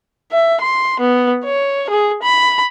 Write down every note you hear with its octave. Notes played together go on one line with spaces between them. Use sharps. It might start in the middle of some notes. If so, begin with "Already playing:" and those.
E5
C6
B3
C#5
G#4
B5